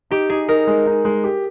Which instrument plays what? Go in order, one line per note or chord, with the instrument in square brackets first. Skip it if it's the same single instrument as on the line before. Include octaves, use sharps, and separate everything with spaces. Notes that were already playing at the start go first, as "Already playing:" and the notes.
[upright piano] D#4 [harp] G4
[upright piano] D#4 [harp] G#4
[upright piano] D#4 [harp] A#4
[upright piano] G#3
D#4
G#3
G4